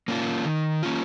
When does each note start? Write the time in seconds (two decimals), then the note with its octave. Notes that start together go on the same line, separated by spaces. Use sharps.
0.08 A#3 C#4 F4
0.45 D#3
0.83 A#3 C#4 F4